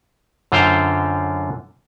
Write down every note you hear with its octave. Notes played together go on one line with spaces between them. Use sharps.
F#2 D3 F4 C5 F5 G5